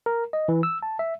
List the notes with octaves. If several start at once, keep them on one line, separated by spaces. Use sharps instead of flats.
A#4
D#5
E3
E6
A5
E5